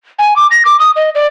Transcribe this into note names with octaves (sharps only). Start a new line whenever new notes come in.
G#5
D6
A#6
D6
D#6
D#5
D5